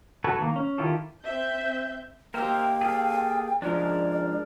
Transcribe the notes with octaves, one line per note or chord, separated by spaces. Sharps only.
F#4 A4 B4 G#5
D#3 A#3
C#4
D#3 E4 F4 G4 A4
C4 E5 G6
A#3 G4 A#4 C5 E5 G5
G#4 A4 F5
G#2 F3 D4 G#4 A#4 D5